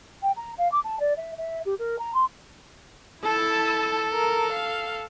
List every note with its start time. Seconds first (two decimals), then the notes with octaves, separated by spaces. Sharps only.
0.22 G5
0.37 A#5
0.58 F5
0.72 D6
0.84 A5
1.00 D5
1.17 E5
1.38 E5
1.65 G4
1.79 A#4
1.99 A#5
2.14 C6
3.23 E4 A4 A5 E6
4.12 A#4
4.52 F5